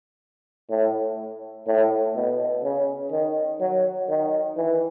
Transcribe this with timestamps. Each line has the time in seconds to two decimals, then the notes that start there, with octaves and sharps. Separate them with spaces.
0.70 A2
1.67 A2
2.15 B2
2.64 C#3
3.12 D#3
3.61 F#3
4.09 D#3
4.57 E3